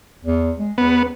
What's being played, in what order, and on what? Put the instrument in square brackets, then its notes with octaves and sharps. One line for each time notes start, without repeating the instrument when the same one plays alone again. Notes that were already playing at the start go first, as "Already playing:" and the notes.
[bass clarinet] E2
G#3
[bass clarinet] E2 [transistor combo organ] B3